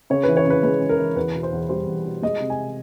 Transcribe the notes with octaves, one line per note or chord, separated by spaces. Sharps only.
C#3 C#5
B4
E3
C#5
C#3
B4
G#3 B4
C#3
A#4
E3
E2 B4
B2
C5
E2
G3 C5
E2
B2
G#3 D#5
C3
G#5